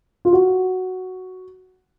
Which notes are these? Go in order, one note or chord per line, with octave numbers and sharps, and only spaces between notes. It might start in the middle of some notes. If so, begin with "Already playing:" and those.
F4
F#4